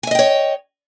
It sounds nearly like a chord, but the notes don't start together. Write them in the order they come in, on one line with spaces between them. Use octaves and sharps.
G#5 E5 D#5 G5 C#5